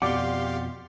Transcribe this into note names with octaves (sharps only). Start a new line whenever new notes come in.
F2 B2 G4 D5 F5 F#5 C6 D6